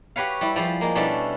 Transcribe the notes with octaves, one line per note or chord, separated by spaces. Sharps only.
F#4 G4 B4 C#5 F5
G3 E4
F3 G3 G#4 C5
G#3 A#3
B2 G3 C#4 D4 E4 A4